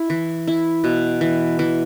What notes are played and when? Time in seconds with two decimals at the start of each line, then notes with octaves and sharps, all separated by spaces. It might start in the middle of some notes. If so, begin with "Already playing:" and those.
Already playing: E4
0.10 E3
0.47 E4
0.84 B2
1.21 E3
1.59 E3